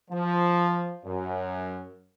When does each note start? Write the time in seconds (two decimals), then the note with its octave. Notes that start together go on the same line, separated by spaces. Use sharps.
0.11 F3
1.05 F#2